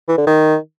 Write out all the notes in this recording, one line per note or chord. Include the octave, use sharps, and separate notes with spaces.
E3
D3
D#3